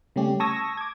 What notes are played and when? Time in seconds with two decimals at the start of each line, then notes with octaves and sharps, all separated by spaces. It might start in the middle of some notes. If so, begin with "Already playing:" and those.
0.16 C#3 G3 A3 C#4 G4
0.40 A5 C#6 D#6 E6 G#6 A#6
0.77 D6 G#6